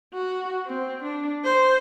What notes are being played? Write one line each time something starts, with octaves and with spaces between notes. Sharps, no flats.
F#4
C4
D4
C5